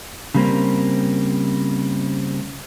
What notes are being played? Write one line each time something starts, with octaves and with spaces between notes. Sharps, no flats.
C#3 G3 A#3 C4